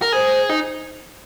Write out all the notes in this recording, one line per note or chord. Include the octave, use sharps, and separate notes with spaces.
A#4
G#4 C5
D#4